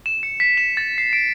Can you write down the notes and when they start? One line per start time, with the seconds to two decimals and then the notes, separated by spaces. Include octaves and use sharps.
0.06 E7
0.23 C#7
0.40 B6
0.57 E7
0.77 A6
0.98 C7
1.13 D7